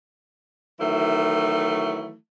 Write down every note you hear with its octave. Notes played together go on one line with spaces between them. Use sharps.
D#3 E3 F#3 A3 E4